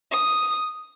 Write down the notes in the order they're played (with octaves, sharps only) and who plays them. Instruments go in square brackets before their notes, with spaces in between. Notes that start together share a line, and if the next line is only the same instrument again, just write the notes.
[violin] D#6